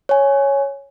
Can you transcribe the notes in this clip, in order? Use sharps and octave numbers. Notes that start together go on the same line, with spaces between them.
C#5 G#5